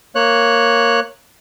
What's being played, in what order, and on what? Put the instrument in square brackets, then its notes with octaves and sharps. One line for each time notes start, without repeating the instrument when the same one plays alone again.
[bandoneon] A#3 C#5 F#6